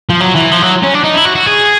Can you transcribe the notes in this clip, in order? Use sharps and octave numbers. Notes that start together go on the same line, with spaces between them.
F3
F#3
E3
F3
F#3
C#4
D4
D#4
E4
F#4
F#4
G#4